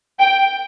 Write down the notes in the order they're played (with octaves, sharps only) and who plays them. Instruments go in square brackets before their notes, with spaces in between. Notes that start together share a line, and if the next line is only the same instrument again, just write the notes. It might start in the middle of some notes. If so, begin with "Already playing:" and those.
[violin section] G5